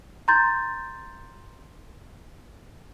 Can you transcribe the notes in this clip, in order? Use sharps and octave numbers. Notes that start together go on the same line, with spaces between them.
A#5 C6 G6 A6